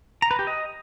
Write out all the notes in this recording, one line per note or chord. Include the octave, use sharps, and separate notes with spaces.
A#5
B4
G4
D#5